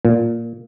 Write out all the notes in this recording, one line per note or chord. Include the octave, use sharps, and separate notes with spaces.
A#2